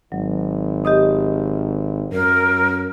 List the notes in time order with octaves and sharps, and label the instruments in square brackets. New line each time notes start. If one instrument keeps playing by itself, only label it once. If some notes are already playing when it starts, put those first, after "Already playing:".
[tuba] G#1 [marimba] F#3
[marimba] G4 D#5 D#6
[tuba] F#2 [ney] A#4